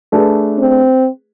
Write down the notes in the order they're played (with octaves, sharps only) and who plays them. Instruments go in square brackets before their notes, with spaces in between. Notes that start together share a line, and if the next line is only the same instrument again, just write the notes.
[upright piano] A3 D4 G#4 B4
[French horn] C4